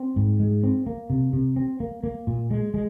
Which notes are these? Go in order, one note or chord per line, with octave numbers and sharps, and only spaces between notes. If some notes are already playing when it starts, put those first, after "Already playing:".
Already playing: C4
G#2
G#3
C4
A#3
C3
C3
C4
A#3
A#3
A#2
G#3
G#3